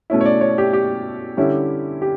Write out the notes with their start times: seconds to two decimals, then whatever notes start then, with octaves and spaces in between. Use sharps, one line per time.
0.10 B2 A3 C#4 E4
0.21 C#5
0.25 D5
0.41 C#5
0.58 G4
0.73 G4
1.37 D3 G3 C#4 E4
2.02 G4